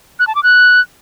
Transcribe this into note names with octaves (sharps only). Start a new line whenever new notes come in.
F#6
A5
D6
F#6